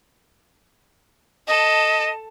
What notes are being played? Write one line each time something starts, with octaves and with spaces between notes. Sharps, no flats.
A4 D#5 A5